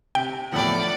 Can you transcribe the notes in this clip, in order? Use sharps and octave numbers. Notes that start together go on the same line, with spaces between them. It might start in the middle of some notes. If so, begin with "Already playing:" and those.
C3 G5
E2 A2 F3 D5 F#5